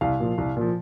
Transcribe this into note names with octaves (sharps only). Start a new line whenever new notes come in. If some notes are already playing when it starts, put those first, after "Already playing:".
C2 F5
A#2 F3
C2
A#2 F3